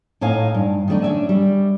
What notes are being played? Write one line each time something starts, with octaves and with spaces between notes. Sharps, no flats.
A2 D#4 C#5 F5 G#5 A#5
G2
D#3 A3 A#3 D4 D#4
C#4 D4 E5
G3